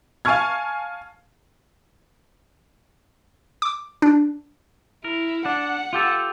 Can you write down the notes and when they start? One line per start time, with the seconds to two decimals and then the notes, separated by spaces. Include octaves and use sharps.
0.25 F5 G#5 A5 C#6 F6 G#6
3.62 D6
4.02 D4
5.04 E4 A#4
5.46 D4 F#5
5.93 F4 G4 A4